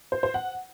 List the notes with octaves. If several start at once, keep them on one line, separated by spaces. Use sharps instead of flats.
C5
C5
F#5